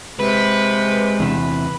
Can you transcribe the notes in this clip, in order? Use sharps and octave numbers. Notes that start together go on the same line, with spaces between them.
C3 G#3 B4
E2 C3